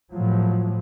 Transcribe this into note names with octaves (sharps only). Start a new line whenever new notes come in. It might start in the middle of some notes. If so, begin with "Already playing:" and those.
A2 F3 F#3